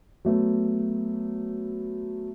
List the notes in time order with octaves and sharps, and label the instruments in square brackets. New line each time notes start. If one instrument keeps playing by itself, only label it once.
[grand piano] F#3 A3 B3